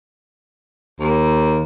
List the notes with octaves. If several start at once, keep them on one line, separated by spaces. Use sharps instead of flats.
D#2